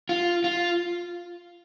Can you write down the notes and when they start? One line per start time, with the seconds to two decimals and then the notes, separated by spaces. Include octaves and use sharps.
0.09 F4
0.44 F4